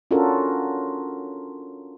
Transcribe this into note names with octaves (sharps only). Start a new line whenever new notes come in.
C#4 D4 F4 F#4 A4 A#4